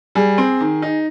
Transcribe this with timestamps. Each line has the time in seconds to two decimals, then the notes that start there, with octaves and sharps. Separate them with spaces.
0.15 G3 G#4
0.38 C4
0.60 D#3
0.82 D#4